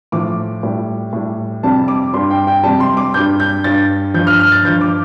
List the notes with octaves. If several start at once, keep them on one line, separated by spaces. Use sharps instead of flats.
A2 F3 D6
A2 G3
A2 G3
F2 C3 G3 A5
D6
G2 G3 C6
G5
G5
F2 C3 G3 A5
C6
D6
G2 G3 G6
G6
G2 G3 A6
G2 F3 G6
F6
F6
A6
G2 F3 G6
D6